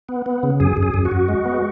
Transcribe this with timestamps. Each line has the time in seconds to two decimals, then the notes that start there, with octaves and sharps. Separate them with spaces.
0.09 B3
0.26 B3
0.43 C#3
0.60 F#2 G#4
0.77 F#2
0.83 G#4
0.94 F#2
1.05 F#4
1.11 F#2
1.28 G#3
1.45 B3